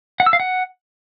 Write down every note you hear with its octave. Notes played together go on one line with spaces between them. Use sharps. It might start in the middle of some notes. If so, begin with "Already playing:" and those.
F#5
E6
F5
F#5